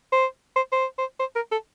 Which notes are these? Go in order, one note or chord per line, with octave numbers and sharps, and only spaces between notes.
C5
C5
C5
C5
C5
A#4
A4